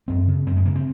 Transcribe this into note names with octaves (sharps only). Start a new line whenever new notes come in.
F#2 C4
C#3
F#2 C4
G#3
C#3 A#3
C4